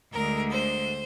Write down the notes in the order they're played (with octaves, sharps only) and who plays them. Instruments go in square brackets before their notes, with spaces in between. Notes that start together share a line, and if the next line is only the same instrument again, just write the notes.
[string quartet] D2 D3 G#3 A#4
C5